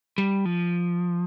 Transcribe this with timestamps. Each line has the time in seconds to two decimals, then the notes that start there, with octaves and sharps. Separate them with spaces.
0.18 G3
0.45 F3